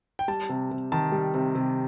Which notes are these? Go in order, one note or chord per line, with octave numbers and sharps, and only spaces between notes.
G5
G3 A5
C3
C3
D#3 A5
G3
C3
C3